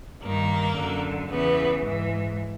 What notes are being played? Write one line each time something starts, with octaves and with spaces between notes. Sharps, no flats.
G2 D#3 A#3
F#2 D3
E2 C#3 E3 B3
G#2 E3